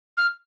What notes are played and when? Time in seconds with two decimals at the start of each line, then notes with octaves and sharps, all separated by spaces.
0.17 F6